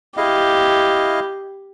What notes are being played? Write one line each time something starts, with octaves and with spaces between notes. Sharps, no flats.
E4 G4 D#5 F5